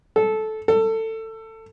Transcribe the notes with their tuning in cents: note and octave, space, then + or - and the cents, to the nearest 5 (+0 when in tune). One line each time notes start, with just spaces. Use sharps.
A4 -15
A4 +20